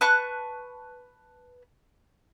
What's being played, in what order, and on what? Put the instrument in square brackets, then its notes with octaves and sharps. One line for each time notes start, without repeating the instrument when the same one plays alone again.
[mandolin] B4 A5 C#6 F#6